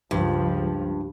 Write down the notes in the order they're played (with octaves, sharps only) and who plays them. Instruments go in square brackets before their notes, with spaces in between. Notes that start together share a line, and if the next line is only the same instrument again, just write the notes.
[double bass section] C#2 F3 [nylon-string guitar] G2